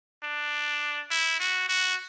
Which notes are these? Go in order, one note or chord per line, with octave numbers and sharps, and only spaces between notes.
D4
E4
F#4
F#4